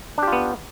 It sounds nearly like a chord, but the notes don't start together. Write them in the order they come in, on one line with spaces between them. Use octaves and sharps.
D4 G4 F4 B3